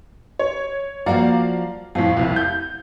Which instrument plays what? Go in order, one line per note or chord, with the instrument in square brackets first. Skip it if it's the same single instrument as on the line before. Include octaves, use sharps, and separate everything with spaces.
[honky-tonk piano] C#5
[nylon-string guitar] F3 A#3 F#4 [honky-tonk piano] D5 F5 A#5
[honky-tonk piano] F2 A2 [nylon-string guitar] F5
[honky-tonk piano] C2 F2
G6